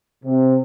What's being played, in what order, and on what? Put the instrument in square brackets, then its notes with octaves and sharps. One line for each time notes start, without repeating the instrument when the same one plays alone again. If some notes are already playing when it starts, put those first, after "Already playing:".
[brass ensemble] C3